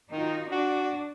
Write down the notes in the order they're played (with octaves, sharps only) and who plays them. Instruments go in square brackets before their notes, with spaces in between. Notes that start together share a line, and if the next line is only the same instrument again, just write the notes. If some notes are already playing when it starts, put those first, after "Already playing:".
[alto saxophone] D#3 [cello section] D#4 F4 F#4
[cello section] D4 [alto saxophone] F#4